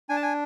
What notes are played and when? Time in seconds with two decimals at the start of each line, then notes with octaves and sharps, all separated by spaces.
0.09 D4 G#5
0.16 A5
0.23 G#5